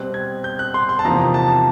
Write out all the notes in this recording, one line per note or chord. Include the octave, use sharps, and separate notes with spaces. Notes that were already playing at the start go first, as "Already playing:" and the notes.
Already playing: B2 G3 C4 F#6
G#6
G6
F#6
C6
C6
A5
E2 C3 F3 A#3 D#4 A#5
A5